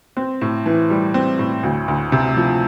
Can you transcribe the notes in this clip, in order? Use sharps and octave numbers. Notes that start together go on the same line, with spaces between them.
C4
A2
E3
G3
C4
A2
D2
D2
C3
F3